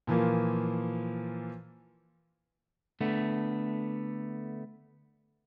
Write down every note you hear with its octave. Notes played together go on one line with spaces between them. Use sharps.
A#2 E3 F3 A#3
D3 A3 B3